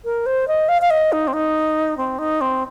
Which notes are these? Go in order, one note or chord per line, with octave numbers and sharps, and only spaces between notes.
A#4
C5
D#5
F5
F5
D#5
D#4
C4
D#4
C4
D#4
C4